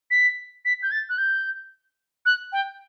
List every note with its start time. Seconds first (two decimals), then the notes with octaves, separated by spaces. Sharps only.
0.11 B6
0.65 B6
0.83 G6
0.91 A6
1.09 F#6
1.18 G6
2.26 F#6
2.52 G5